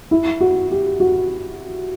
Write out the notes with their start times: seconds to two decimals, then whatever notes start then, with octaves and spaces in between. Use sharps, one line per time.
0.11 E4
0.41 F#4
0.71 G4
1.00 F#4